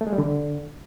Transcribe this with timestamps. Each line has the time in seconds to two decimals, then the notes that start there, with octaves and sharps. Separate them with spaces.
0.01 A3
0.07 G#3
0.13 G3
0.18 D3